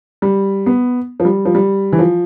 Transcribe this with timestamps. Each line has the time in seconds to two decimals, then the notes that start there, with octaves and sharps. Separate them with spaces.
0.22 G3
0.66 B3
1.20 F3
1.25 G3
1.45 F3
1.55 G3
1.92 E3
1.99 F3